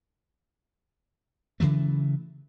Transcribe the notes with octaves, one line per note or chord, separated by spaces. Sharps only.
C#3 E3 F#3 A3